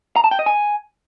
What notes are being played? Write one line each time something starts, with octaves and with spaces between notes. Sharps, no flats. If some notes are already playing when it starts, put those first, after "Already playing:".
A#5
A5
G5
D#5
G#5